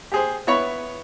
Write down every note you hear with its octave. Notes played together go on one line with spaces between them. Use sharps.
G4 G#4 C5
B3 E4 C#5 B5 C#6